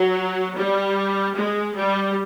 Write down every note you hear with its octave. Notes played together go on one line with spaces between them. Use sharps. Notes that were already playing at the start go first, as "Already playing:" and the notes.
Already playing: F#3
G3
G#3
G3